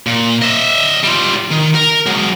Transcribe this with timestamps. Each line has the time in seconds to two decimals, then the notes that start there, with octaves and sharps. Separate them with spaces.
0.07 A#2
0.42 D#5 E5
1.04 G3 F4
1.51 D#3
1.75 A#4
2.06 F#3 G#3